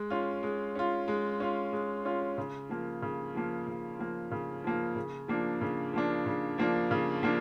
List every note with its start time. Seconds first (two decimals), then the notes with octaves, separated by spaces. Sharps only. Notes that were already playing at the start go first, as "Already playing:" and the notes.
Already playing: G#3
0.10 C#4 F4
0.43 G#3
0.75 C#4 F4
1.08 G#3
1.40 C#4 F4
1.73 G#3
2.05 C#4 F4
2.38 C#3
2.69 F3 A#3
3.02 C#3
3.35 F3 A#3
3.67 C#3
3.99 F3 A#3
4.31 C#3
4.64 F3 A#3
4.96 C#3
5.28 F3 A#3 D4
5.61 C#3
5.93 F3 A#3 D4
6.26 C#3
6.58 F3 A#3 D4
6.91 C#3
7.23 F3 A#3 D4